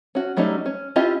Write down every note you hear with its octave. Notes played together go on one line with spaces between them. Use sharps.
C#4 F#4
F#3 G3 A3 C#4 D#4
C#4
C#4 E4 F4 G4 D#5